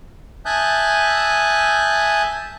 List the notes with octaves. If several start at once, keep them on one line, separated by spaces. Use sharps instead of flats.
E5 G#5 A5 D#6 F#6 G6